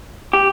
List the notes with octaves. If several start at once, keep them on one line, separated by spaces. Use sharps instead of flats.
G4